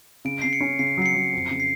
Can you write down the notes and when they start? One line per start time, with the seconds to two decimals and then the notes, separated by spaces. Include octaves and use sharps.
0.25 C#3 D7
0.42 C#3 C7
0.53 C#7
0.61 C#4
0.79 C#3 C7
0.97 F#3 C7
1.06 C#7
1.15 F#3
1.33 F2
1.51 C#3
1.60 C7